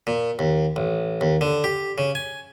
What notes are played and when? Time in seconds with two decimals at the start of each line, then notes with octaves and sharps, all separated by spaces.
0.07 A#2
0.39 D#2
0.76 A1
1.21 D#2
1.41 D3
1.64 G4
1.98 C#3
2.15 G#5